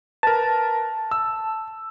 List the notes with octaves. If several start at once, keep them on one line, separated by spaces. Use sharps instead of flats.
A#4 B4 A5
E6